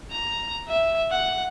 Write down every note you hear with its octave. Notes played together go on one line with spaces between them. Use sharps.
A#5
E5
F#5